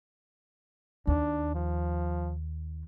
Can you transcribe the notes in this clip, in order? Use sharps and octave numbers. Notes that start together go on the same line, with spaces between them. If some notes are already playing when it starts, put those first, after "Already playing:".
D#2 D4
F3